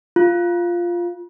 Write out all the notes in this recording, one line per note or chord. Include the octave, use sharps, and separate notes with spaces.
F4